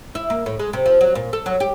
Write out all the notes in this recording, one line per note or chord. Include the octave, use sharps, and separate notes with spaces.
E4
A#3
A2
G#3
C3
F3
F#3
A#2
A4
F#3
G4